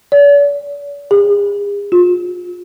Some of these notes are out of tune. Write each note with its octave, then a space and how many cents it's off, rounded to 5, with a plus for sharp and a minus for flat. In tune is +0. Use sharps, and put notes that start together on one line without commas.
D5 -45
G#4 -40
F4 +35